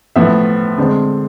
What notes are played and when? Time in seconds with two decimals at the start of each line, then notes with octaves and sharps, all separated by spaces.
0.16 A2 F3 B3 E5
0.78 D3 G#3 C4